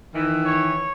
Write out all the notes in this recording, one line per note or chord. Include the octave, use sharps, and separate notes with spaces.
D#3 E3
C#5